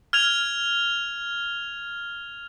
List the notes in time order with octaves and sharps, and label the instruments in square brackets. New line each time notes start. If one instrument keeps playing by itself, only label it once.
[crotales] F6 G#6 F7